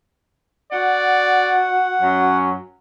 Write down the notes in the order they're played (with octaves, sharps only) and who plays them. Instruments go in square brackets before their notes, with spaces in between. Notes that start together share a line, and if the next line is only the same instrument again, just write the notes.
[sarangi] F#4 [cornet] D5 [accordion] F#5
[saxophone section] F#2 F#3 [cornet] C#4